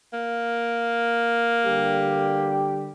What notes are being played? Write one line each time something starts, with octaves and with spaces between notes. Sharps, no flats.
A#3
D3 G3 G4